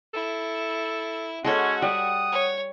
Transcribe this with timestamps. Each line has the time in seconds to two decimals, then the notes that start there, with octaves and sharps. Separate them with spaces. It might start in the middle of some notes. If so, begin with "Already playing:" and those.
0.14 E4 A4
1.44 G#3 C#4 F#4 A4 C#5 F#5
1.82 G3 D#6
2.32 C#5